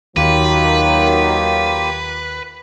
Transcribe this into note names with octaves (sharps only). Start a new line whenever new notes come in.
D#2 D#3 F#3 A#3 F4 G4 B4